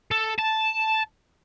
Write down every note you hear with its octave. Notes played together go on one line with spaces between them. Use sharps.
A4
A5